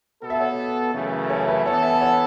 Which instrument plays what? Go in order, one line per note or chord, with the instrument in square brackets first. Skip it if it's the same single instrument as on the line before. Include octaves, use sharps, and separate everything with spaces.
[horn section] B2 B3 A4
[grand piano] E5
C#5 F#5
[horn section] F#2 C#3 E3 A3
[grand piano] A4 C#5
B4 E5
[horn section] E3 B3 A4 [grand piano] C#5 F#5
[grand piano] E5 A5
C#5 F#5